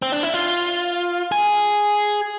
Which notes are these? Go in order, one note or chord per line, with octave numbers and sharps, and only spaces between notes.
C4
D4
E4
F4
G#4